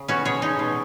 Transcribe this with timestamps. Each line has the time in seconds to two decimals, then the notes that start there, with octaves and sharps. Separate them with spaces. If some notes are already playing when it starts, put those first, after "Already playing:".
Already playing: C#3
0.08 B3 C#4 F#4
0.25 B2 G#4 C#5
0.42 G#3 D#4
0.59 B2